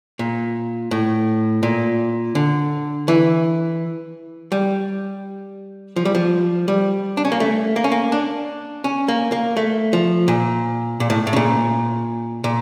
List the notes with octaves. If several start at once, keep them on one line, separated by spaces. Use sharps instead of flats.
A#2
A2
A#2
D3
E3
G3
F3
G3
F3
G3
D4
C#4
A#3
A3
A#3
C#4
A#3
D4
C#4
A#3
A#3
A3
F3
A#2
A#2
A2
A2
C#3
A#2
A#2